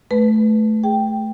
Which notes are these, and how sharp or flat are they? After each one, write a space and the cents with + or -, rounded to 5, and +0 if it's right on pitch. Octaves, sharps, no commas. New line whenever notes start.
A3 -15 B4 +0
G#4 -5 G5 +0